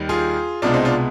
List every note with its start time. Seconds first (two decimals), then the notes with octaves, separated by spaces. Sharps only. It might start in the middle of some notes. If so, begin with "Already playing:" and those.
Already playing: D#2 D#3 G3
0.09 F4 G#4
0.62 C2 B2 G#3 D4 F4
0.74 C4 D#4
0.85 D4 F4